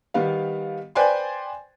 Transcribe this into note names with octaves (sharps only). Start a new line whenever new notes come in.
D#3 G3 B3 F5
B4 C5 D5 G5 G#5 C6